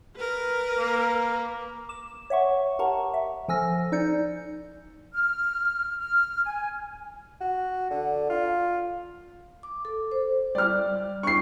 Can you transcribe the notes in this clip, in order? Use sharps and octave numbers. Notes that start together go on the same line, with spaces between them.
A#4 B4
A#3
D6 E7
C#5 E5 F#5 C#6
G4 A#4 F#5 A5 A#5 C#6
E5
F3 A4 G#5 E6 F6 A#6
D#4 D5 G6 C#7
F6
F6
G#5
F#4
D3
F4
D6
A4
C5
G3 D5 F6
D4 E4 C#6 C7